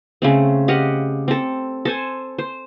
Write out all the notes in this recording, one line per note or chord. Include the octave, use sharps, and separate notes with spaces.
C#3 A3 C4
G4 D#5 F5 F#5
C4 A4
A4 C5 G#5
C5